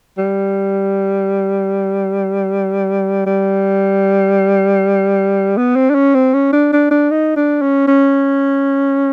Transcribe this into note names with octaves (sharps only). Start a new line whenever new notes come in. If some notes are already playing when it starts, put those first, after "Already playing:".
G3
G3
B3
C4
D4
C#4
C4
C#4
D4
D4
D4
D#4
D4
C#4
C#4